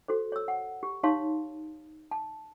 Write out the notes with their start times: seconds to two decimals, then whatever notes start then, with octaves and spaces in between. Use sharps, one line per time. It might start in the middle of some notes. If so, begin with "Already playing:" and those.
0.08 F#4 A4 C5
0.32 C#5 E6
0.48 F#5
0.83 G4
1.03 D#4 G4 C#5 F5 A5 C6
2.11 A5